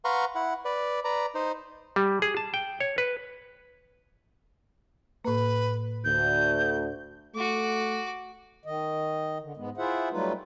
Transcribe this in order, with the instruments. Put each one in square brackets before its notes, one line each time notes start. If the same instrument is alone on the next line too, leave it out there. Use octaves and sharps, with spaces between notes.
[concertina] B4 F5 F#5 A#5 C6 C#6
E4 F#5
B4 D5
B4 D5 A#5
D#4 C5
[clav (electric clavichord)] G3
G#4
A5
G5
C#5
B4
[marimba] A2 A#3 [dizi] B4
[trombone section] D2 [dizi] G6
[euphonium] A3 [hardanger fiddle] F#4 D6
[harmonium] D#3 D#5
D3
G#2 G#3 B3
E4 F4 G#4 C5 E5 F#5
F#3 G3 A3 D#4 F4 B4